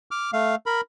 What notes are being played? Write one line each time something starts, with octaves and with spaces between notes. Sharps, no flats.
D6 F6
A3 F5
A#4 B5